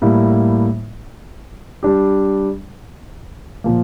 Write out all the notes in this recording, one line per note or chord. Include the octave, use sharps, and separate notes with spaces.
A2 G3 A#3 E4
G3 D4 G4
A#2 F3 A#3